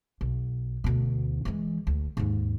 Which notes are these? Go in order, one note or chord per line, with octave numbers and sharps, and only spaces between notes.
B1
D2 B2
E3 G#3
D2
D#2 G#2